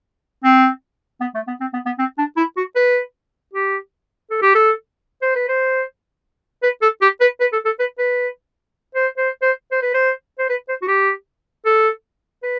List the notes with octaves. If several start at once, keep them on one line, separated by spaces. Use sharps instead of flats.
C4
B3
A3
B3
C4
B3
B3
C4
D4
E4
F#4
B4
G4
A4
G4
A4
C5
B4
C5
B4
A4
G4
B4
B4
A4
A4
B4
B4
C5
C5
C5
C5
B4
C5
C5
B4
C5
F#4
G4
A4
B4